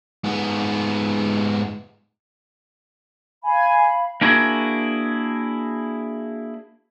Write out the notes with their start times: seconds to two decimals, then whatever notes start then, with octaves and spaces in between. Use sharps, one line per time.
0.24 G#2 B3
3.43 F5 G#5 B5
4.21 A#3 D4 E4 F#4 G#4 A#4